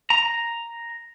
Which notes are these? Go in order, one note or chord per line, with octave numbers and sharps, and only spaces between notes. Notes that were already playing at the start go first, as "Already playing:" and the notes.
A#5